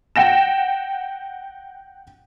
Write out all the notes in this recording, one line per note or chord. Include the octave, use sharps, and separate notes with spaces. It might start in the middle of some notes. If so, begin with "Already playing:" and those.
F#5 G5 A#6 E7